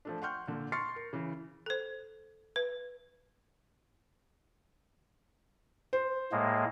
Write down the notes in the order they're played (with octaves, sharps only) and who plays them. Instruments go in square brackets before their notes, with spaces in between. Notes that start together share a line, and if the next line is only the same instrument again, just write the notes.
[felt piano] F3 A3 D4
F#5 G5 C6 C#6 F6 G6
A#2 D3
C6 C#6 F6 A6 C7 C#7
A#4
C#3 E3
[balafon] A4 C5
B4
[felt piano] C5
[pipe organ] A2 G#3 A#3